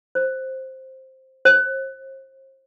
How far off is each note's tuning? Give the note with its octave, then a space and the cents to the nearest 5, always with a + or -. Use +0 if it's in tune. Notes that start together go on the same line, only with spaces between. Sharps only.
C5 +5
C5 +35